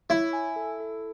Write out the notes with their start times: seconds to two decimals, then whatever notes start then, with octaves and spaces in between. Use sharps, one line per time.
0.10 E4 C#5
0.33 G#5
0.56 A4
0.80 A4